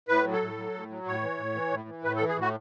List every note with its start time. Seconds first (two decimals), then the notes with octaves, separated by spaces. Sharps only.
0.08 A2 B4
0.25 F#3
0.33 A4
0.42 A2
0.57 F#3
0.74 A2
0.90 F#3
1.06 A2 C#5
1.22 E3
1.38 A2
1.55 E3
1.71 A2
1.88 E3
2.04 A2 B4
2.16 A4
2.20 E3
2.28 G#4
2.36 A2 F#4